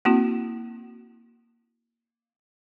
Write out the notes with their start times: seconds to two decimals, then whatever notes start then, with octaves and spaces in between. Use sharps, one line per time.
0.05 A#3 C4 E4 F#4